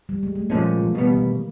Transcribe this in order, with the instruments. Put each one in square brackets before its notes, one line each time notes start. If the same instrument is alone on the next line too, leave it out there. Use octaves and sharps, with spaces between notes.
[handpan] G3
G#3
A3
[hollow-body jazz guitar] A#2 F3 G#3 C#4 [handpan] A#3
[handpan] E3
[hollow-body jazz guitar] B2 G3 B3 [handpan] E3
[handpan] D#3
E3